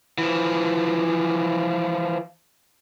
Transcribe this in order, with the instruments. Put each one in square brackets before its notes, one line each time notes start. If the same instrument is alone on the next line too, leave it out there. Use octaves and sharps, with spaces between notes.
[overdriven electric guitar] E3 F3